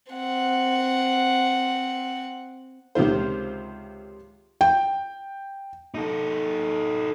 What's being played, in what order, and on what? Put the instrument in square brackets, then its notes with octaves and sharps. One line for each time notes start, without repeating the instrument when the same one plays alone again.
[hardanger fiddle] C4 F#5
[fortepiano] C#2 C3 D#3 F4 C5
[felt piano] G5
[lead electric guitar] D#4 A4